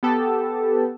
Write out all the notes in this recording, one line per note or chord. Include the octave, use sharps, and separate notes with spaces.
B3 G4 A4